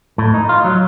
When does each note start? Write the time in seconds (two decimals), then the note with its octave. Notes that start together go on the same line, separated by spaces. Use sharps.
0.18 A2
0.34 D#4
0.49 F4
0.64 F#3